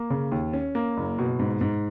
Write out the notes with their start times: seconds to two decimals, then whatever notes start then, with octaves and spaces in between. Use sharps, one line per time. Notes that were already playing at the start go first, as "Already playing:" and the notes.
Already playing: A#3
0.10 C#3
0.32 D#2
0.53 C#4
0.75 A#3
0.97 F#1
1.19 B2
1.39 G#2
1.61 G#2